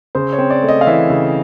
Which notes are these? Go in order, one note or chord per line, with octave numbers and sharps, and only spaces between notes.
C#3 C5
C#5
C4
D5
A3
D#5
F5
E3 E5
C#3